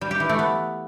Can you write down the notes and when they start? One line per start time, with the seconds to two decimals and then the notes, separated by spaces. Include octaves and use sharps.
0.01 G3
0.11 G4
0.20 E3
0.29 A3
0.39 B3